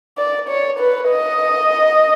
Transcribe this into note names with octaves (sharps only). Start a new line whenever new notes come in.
D5
C#5
B4
D#5